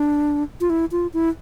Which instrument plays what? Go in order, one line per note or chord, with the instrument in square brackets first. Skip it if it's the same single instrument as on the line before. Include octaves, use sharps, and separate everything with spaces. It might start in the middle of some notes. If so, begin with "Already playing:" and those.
Already playing: [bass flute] D4
F4
E4
F4
E4